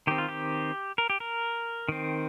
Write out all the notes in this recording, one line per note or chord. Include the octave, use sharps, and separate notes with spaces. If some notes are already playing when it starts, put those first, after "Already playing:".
D#3 C4 G4
F4
G4
A#4
G4
A#4
D#3 C4